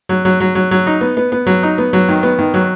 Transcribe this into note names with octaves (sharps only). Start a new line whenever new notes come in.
F#3
F#3
F#3
F#3
F#3
D#4
B3
B3
B3
F#3
D#4
B3
F#3
D#3
B3
D#3
F#3